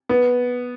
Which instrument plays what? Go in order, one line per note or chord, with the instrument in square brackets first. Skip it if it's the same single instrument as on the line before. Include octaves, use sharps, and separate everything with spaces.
[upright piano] B3